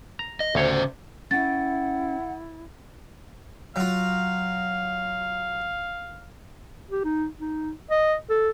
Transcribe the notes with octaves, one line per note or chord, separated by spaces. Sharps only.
A#5
D#5
D2 C#3 C#4 C5 C#5
C#4 E4 F#5 G5 A6
F#3 F4 F5
G4
D#4
D#4
D#5
A4